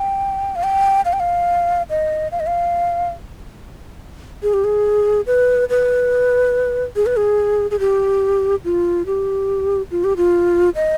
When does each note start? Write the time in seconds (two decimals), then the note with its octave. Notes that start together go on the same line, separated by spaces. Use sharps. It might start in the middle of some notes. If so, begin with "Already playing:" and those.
Already playing: G5
0.56 F5
0.63 G5
1.05 F5
1.13 G5
1.20 F5
1.90 D#5
2.32 F5
2.40 D#5
2.47 F5
4.43 G#4
4.53 G4
4.64 G#4
5.27 B4
5.70 B4
6.96 G#4
7.06 B4
7.17 G#4
7.71 G#4
7.80 G4
8.65 F4
9.06 G4
9.91 F4
10.04 G4
10.17 F4
10.75 D#5